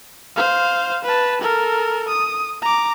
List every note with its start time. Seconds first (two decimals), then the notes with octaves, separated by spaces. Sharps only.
0.36 C5 F5
1.04 B4 A5
1.41 A4 A#4
2.08 D#6
2.62 A#5 D6